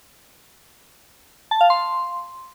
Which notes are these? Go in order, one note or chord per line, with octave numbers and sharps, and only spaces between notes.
A5
F5
C6